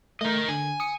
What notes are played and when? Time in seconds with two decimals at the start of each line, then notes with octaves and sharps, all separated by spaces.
0.21 A3 A#4 D#5 G6
0.49 D3 G#5
0.80 D#6 C#7